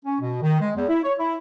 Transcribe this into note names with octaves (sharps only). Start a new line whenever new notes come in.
C#4
B2
D#3
G#3
E2
E4
C#5
E4